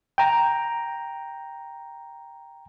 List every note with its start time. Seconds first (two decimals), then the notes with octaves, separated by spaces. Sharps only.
0.18 G5 A#5